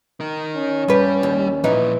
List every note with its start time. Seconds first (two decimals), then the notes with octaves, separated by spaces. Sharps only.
0.20 D#4 A#4
0.57 C#4
0.88 G2 G3 B4
1.23 D#2
1.64 A#2 E3 F3 D#4